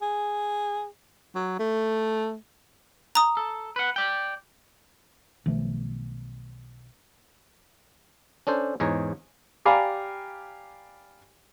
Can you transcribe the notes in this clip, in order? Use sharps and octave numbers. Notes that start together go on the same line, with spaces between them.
G#4
F#3
A3
A#5 D#6
A4
B4 F#5
D5 G5
B1 D#3 F3 A3
C#4 D4 A4 C5
E2 G#2 G#4 C#5 A#5
G4 D5 F5 G#5 A#5 B5